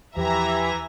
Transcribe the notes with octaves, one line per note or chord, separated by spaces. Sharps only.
E2 E3 F3 G4 E5 A#5